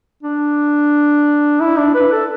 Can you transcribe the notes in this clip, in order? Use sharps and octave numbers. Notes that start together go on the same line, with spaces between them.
D4
E4
D4
B4
A4